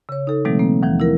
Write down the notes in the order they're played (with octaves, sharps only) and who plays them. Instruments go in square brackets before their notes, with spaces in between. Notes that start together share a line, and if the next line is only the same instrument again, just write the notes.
[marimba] C#3 C#5
D#4 A4
B2 E3 F#3 G#3 A3 C4
A#3 C4
D#2 E3 F3
E4 A#4